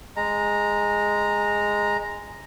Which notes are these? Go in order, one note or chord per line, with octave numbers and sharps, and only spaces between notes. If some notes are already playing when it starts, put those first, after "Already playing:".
G#3 A#5